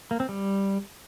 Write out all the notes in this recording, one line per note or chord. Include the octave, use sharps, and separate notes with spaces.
A#3
C4
G3